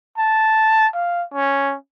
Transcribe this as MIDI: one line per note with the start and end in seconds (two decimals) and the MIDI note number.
0.18 0.87 81
0.94 1.23 77
1.34 1.75 61